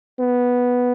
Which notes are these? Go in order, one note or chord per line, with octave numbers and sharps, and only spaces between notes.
B3